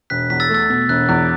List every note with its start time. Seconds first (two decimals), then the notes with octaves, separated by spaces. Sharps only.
0.10 E1 F#6 B6
0.30 E2 B6
0.40 E6 A6
0.49 A3
0.54 E6 A6
0.70 B2
0.89 E1 F#6
1.09 E2 F#6